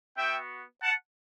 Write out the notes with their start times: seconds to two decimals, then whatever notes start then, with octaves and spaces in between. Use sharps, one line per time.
0.16 B3 F#4 E5 G5
0.82 F#5 A5